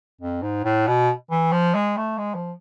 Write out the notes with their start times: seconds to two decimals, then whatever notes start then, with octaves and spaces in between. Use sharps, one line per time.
0.21 F2
0.42 G#2
0.64 A2
0.87 B2
1.30 E3
1.52 F3
1.74 G#3
1.97 A3
2.18 G#3
2.34 F3